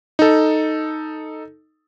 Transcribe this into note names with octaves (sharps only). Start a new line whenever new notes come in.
D#4 A4